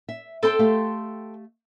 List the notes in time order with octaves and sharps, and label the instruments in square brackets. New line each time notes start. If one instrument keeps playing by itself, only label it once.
[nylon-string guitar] E5
[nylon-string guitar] C4 C5 [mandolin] A4 G5 C6
[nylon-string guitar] A3 G4 F5